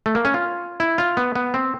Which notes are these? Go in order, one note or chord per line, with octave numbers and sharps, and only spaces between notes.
A3
A#3
C#4
F4
E4
F4
B3
B3
C4